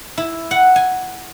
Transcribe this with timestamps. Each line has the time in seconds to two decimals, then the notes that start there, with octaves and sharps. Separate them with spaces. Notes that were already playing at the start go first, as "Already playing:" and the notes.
0.18 E4
0.51 F#5
0.76 G#5